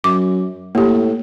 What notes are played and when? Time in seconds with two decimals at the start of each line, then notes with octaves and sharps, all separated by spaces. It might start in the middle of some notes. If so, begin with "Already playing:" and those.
0.04 F#2 D6
0.75 A2 A#3 G4